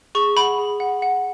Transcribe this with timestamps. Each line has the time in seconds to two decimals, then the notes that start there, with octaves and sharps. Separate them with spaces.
0.15 G#4 C#6
0.37 F#5 B5
0.58 G#4
0.80 F#5
1.02 F#5